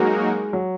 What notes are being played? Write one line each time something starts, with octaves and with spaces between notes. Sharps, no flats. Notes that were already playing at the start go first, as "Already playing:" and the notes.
Already playing: F#3 G#3 A#3 D#4 F#4 A#4
F#3